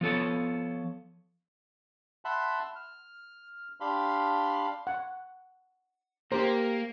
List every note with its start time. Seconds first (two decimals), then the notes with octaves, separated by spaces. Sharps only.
0.01 F3 B3 A4 C#5
2.25 E5 F#5 A5 B5 C6
2.75 F6
3.80 D4 G4 F5 B5 C6
4.87 F#5
6.32 A#3 G4 A#4 C5